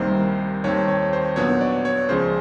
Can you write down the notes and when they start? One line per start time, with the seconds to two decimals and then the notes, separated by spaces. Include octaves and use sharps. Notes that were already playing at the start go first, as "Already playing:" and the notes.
Already playing: C2 C3 D#3 G3 A#3 C5
0.64 D#2 D#3 G3 C4 C#5
0.88 C#5
1.13 C5
1.36 A#2 F#3 B3 D4 C#5
1.61 D5
1.85 C#5
2.09 C#2 C#3 F3 G#3 C5